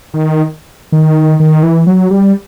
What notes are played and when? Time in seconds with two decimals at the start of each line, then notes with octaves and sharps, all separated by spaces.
0.14 D#3
0.92 D#3
1.40 D#3
1.63 E3
1.87 F#3
2.11 G3